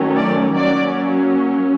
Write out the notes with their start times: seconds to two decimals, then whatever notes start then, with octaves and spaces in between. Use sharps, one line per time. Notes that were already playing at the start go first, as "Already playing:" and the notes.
Already playing: D#3 F#3 A3 C#4
0.16 D5
0.55 F#3 A#3 C#4 D5